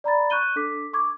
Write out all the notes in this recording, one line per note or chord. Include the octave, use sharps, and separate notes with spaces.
D5 A#5 B5 A6
C#6 F#6 G6 D#7 G7
D4 A4 D6 B6
C#6 D6 G#6